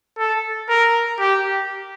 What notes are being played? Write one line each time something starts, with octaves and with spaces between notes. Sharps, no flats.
A4
A#4
G4